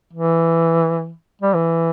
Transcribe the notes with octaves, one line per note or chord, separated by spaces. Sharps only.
E3
G3
E3